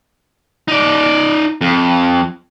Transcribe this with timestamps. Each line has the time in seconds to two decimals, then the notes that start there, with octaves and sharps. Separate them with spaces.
0.68 D#4 D5
1.61 F2